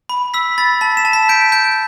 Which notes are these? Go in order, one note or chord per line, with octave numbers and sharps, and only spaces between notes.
B5
E6 B6
B5 A6
A5 B6
E7
A5
B6
G6 D7
G6 D7